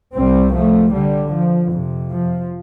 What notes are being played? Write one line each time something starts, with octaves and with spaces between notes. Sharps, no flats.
C2 C3 G3 C4
F3 A3
D3 G3
F3
F2 C3
F3